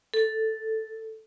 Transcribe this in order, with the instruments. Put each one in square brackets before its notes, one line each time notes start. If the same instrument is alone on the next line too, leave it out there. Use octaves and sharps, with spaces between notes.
[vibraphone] A4